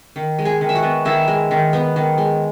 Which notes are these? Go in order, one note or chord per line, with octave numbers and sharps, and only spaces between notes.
D#3
G#3
G#4 G#5
D#3
E5
F#4 F#5
B3
D#3 E4 E5
G#3
D#3
B3
D#3
G#3